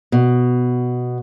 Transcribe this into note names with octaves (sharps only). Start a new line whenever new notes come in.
B2